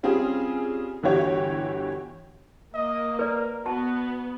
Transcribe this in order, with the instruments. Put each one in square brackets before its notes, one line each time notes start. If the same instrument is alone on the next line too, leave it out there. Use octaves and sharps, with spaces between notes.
[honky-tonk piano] G3 C4 C#4 F4 G#4
G1 E3 F#4 G4 C#5
[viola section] A#3 [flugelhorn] D#5
[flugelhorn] A#4 [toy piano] B4 D5
[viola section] B3 [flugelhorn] F#4 [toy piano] A5